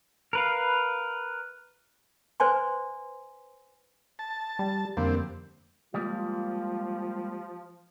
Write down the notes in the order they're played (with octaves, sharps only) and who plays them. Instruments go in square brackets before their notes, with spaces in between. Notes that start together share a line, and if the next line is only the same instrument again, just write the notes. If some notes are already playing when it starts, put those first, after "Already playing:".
[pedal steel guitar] A#4 B4 F5
[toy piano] B4 C5 D5 G#5 C6
[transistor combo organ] A5
[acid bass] G3
[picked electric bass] F2 [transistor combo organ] D3 G3 C4 [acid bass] A#3
[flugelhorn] F3 [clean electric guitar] G3 G#3 A#3 [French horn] F4